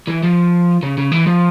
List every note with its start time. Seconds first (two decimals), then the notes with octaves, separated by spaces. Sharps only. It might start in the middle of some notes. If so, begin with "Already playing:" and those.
0.08 E3
0.23 F3
0.83 C#3
0.98 C#3
1.12 E3
1.27 F3